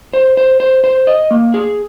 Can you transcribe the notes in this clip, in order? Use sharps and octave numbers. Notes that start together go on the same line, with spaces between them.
C5
C5
C5
C5
D#5
A#3
G#4